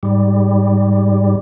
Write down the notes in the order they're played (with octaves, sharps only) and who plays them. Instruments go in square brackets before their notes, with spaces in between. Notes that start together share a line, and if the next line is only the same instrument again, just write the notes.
[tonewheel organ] G#2 G3